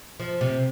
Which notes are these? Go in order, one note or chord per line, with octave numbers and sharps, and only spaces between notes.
F3
C3